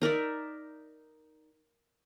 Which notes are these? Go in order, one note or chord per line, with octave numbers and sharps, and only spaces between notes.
D#4 A#4 D5 E5